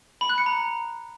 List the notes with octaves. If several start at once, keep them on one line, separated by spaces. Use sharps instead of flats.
B5
F#6
C#7
A#5